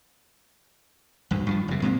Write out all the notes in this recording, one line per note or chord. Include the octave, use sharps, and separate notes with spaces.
D#1 D2 G2
G2 E3 F3
F#1 C3
A#2 G#3 A#3 C4